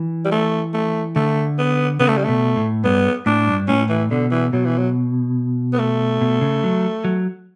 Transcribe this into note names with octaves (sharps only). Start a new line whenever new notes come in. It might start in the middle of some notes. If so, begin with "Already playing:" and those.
Already playing: E3
G3
A3
A3
D3 A3
B3
C#3 B3
A3
G3
B2 A3
A2
G2 B3
A2 D4
G2
A2 C#4
E3
B2 D3
E3
B2 F#3
E3
F#3
B3
A3
B2
C#3
F#3
F#3